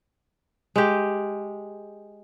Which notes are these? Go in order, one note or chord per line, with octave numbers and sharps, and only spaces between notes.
G#3 G4